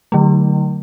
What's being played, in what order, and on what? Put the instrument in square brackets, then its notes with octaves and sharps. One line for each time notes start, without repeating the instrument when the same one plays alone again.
[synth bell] D3 F#3 A3